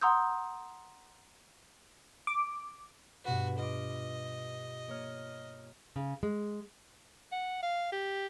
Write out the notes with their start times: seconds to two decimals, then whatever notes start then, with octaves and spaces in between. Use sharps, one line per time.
0.01 F#5 A#5 C6 D#6 E6 G6
2.27 D6
3.25 G2 B2 F#4 B4
3.59 F4 D#5 D6
4.88 A#3 C#5 F6
5.96 C#3
6.23 G#3
7.32 F#5
7.63 F5
7.92 G4